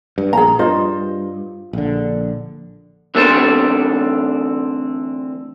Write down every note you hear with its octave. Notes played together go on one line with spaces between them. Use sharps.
G2
A#1 G#4 A#5
G2 F4 C5 D#5
A#1 D3
D3 E3 A3 C4 A4 C5